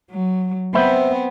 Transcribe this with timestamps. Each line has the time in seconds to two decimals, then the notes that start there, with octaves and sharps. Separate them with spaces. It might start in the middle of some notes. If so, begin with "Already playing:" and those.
0.11 F#3
0.74 B3 C4 C5 E5 B5